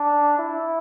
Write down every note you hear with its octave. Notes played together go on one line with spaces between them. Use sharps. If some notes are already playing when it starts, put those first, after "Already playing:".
Already playing: D4
E4